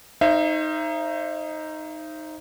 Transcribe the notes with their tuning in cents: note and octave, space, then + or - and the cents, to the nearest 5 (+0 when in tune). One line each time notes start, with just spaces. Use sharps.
D#4 +0 C5 +40 E5 +35